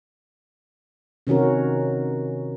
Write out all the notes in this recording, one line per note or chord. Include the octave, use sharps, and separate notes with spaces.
C3 D#3 C#4 F#4 A#4